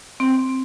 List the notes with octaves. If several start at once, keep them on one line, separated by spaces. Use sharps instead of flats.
C4